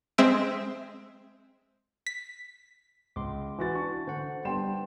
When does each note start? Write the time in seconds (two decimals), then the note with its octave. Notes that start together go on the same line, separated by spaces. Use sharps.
0.18 G#3 C4 E5 E6 D7
2.07 B6
3.16 C#2 C6 D6
3.58 E3 F#4 A6
3.75 D4 C#6
4.07 D3 C5 F#5
4.45 G3 B3 D4 G5 C6 E7